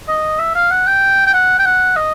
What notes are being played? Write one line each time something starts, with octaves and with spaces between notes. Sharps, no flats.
D#5
E5
F5
F#5
G5
G5
F#5
G5
F#5
D#5